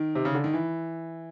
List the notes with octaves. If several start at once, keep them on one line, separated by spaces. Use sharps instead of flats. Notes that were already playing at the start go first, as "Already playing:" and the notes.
Already playing: D#3
C3
C#3
D3
D#3
E3